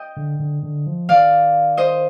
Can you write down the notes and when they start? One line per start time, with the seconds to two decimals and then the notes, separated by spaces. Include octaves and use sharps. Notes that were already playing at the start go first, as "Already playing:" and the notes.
Already playing: D#5 G5
0.17 D3
0.40 D3
0.63 D3
0.87 F3
1.09 D#3 D5 F5
1.77 C5 D#5